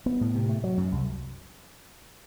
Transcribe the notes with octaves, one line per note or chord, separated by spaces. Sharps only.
B3
A2
C3
A3
F#3
F#2
C2